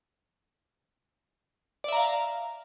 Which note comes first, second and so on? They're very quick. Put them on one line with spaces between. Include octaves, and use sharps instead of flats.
D5 E5 A#5 F5